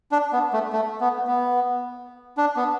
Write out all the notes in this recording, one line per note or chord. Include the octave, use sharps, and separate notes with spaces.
D4
B3
A3
A3
B3
B3
D4
B3